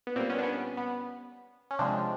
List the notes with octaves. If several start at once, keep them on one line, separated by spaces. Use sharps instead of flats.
B3
A#2 G3 A#3 C4
B3 C#4
D4
B3 C#4
B3
C#4
C3 F3 G#3 C4 D4